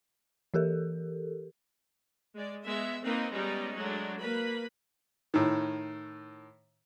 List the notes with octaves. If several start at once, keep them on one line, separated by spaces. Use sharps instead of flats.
E3 G4 A4 A#4
G#3 D5
G#3 B3 E5
A#3 C4 D#4 B4
G3 G#3 B3 C#4 D#4
F#3 G#3 A3 D4
A#3 B4 B5
A2 D#3